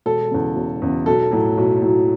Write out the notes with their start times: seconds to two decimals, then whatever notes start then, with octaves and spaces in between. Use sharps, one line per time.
0.06 E1 A4
0.31 E2 C#3
0.56 E1
0.82 E2 C#3
1.06 B1 A4
1.31 A2 F#3
1.58 B1
1.82 A2 F#3